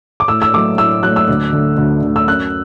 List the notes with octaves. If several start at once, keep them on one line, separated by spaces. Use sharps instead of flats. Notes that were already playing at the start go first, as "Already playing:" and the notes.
D6
A2 E6
E6
F#3 A3 D6
A2 E6
F#3 A3 F#6
E6
D2
D3 A3
D2
D3 A3
E6
F#2 F#6